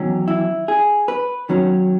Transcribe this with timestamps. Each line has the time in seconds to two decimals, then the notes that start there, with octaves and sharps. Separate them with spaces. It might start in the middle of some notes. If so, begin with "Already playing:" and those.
Already playing: E2 D#3 F#3 C#4
0.28 E4
0.68 G#4
1.08 B4
1.49 D#3 F#3 C#4